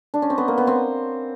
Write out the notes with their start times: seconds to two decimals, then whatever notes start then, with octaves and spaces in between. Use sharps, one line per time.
0.14 D4
0.22 C#4
0.30 C4
0.38 B3
0.48 A#3
0.58 B3
0.67 C4